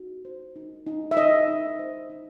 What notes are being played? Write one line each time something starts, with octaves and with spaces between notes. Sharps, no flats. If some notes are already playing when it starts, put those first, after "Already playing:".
Already playing: D#4 F#4
C5
D#4
D#4
E5
D#4 D#5
D#4
C5
D#4